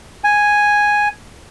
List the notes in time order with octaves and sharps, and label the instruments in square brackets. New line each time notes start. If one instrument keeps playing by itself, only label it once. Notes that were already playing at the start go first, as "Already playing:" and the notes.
[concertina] G#5